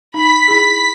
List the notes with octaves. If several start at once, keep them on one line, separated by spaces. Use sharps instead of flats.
D#4 B5 B6
E4 G#4